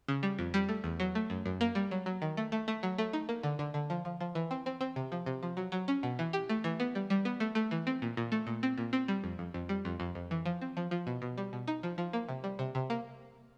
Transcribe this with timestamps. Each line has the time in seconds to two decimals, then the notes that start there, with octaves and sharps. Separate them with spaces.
0.08 C#3
0.23 G3
0.39 F2
0.54 G3
0.69 A3
0.84 E2
1.00 F#3
1.15 A3
1.30 F#2
1.46 F#2
1.61 A#3
1.75 G3
1.91 F#3
2.06 F#3
2.22 D#3
2.37 A3
2.52 A3
2.68 A3
2.83 F#3
2.98 A3
3.13 D#4
3.29 A#3
3.43 D3
3.59 D3
3.74 D3
3.90 F3
4.05 F3
4.21 F3
4.35 E3
4.51 C4
4.66 C4
4.81 C4
4.96 C3
5.12 F3
5.26 C3
5.43 F3
5.57 F#3
5.72 F#3
5.88 C#4
6.03 B2
6.19 E3
6.33 G4
6.49 A3
6.64 E3
6.80 B3
6.95 G3
7.10 G3
7.25 B3
7.40 A3
7.55 A3
7.71 E3
7.87 C4
8.02 A#2
8.17 A#2
8.32 A3
8.47 A#2
8.63 C4
8.78 A#2
8.93 C4
9.08 G3
9.24 F2
9.39 F2
9.54 F2
9.69 G3
9.85 F2
10.00 F2
10.15 F2
10.31 E3
10.46 F3
10.62 C4
10.77 F3
10.91 F3
11.07 B2
11.22 B2
11.38 G3
11.53 B2
11.67 D#4
11.83 F3
11.98 F3
12.13 A#3
12.29 C3
12.44 G3
12.59 C3
12.75 C3
12.90 A#3